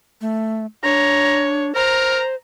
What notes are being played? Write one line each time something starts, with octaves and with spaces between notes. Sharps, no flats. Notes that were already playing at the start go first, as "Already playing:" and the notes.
A3
D4 C#5 A#5
A#4 C5 A#5